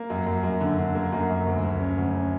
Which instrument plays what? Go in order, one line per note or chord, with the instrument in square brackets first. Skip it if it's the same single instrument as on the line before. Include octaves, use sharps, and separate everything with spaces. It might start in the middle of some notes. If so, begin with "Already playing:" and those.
Already playing: [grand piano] A#3
F#2
F#2
F#2
D3
D3
A#3
F#2
F#2
D2
D2
C#4
D2
C#4